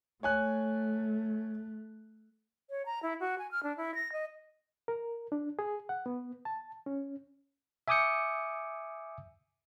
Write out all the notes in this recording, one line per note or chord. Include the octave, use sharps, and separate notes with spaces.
A3 C#5 G#5 F#6
C#5
A#5
E4
F#4
G#5
F6
D4
E4
A#6
D#5
A#4
D4
G#4
F#5
B3
A5
C#4
E5 G#5 D6 D#6 G6 C#7